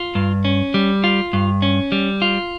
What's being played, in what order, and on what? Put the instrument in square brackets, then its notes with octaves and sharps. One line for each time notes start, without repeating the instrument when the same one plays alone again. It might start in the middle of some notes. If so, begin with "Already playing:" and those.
Already playing: [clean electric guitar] F4
G2
C#4
G3
F4
G2
C#4
G3
F4